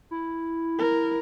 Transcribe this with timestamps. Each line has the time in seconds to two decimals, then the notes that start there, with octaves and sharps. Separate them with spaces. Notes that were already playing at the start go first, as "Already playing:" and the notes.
0.11 E4
0.79 A#4